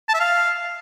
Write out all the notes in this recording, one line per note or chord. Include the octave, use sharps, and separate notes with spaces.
A5
E5
F5